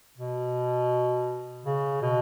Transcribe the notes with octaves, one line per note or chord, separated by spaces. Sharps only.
B2
C#3
B2